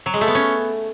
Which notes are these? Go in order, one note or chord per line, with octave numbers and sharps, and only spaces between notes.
F#3
G#3
A3
B3
C#4